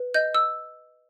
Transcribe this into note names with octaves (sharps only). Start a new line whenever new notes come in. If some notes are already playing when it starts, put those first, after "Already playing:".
Already playing: B4
D#5 G6
E6